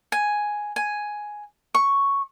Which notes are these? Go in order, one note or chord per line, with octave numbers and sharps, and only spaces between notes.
G#5
G#5
C#6